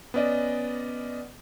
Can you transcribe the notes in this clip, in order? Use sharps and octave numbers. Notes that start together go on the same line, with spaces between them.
B3 C#4 D5 D#5